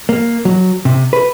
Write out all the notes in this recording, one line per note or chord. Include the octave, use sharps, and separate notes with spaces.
A#3
F#3
C3
B4